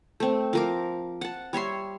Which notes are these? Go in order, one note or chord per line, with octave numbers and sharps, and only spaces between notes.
A3 C4
F3 A#4 D6
F#5 A5
G3 C#5 E5 C6